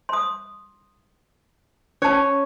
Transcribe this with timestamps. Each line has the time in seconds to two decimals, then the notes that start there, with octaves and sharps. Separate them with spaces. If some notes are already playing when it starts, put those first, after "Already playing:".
0.09 C6 D#6
2.02 C#4 C#5 A5